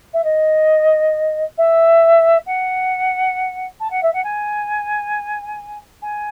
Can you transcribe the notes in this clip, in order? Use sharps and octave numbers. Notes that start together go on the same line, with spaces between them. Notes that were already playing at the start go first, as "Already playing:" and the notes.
E5
D#5
E5
F#5
A5
F#5
E5
F#5
G#5
G#5